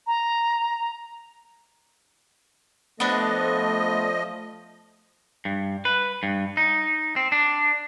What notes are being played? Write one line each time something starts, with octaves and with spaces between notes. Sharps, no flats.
A#5
F3 A3 B3 D4 D#5
G2
B4
G2
D#4
C4
D4